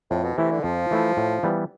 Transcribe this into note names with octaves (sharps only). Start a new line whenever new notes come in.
F2 A2
B2
C3 E3 A3 E4
D3
F2 F3
E3 A3 E4
A2
E3 G3 B3